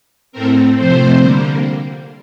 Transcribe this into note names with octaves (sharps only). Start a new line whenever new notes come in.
A2 A3 C4 A#4
C3 F3 A3 C4 C5
D3 G3 A#3